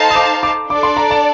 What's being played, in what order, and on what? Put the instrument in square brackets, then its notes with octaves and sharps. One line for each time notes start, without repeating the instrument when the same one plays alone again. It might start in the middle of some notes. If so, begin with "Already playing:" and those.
Already playing: [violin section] D#4 A4 C5 F5 A5
[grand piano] D#6
D6
D6
[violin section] D4 A4 D5 [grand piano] D6
[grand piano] C6
A#5
A5